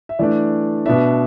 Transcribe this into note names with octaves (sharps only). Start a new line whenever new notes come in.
E5
E3 A3 D4 D5
B2 B3 D4 E5